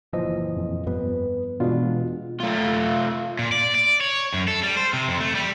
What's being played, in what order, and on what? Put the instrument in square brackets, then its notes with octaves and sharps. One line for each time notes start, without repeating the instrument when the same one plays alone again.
[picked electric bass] F#1 A#2 E3 [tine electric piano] F3 D#5
[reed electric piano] F2
[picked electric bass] G2 G3 B3 [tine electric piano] B4
[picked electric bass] E2 G#3 [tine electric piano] B2 [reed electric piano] D4 F4
[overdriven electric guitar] A3 F4
A#2
D5
D5
C#5
F#2
A4
G3
C5
C3
F2
A3
G3